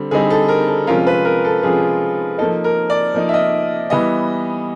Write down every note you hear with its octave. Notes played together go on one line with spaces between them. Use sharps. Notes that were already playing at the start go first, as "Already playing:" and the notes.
Already playing: D3 G3 C4
D3 G3 C4 D#4 G#4
A4
A#4
A4
C3 F3 G#3 C#4 F4 A#4
B4
A#4
A4
C3 F3 G#3 C#4 F4 G#4
F3 A#3 D#4 A4
A#4
D5
F3 A#3 D#4
E5
D#5
E3 G3 B3 E4 D#5